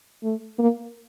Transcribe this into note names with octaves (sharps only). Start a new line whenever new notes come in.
A3
A#3